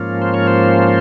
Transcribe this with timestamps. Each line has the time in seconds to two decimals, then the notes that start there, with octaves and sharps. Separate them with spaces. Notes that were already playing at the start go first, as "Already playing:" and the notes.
Already playing: G#2 F3 A#3 C#4 F4
0.22 C5
0.34 C#5
0.47 C5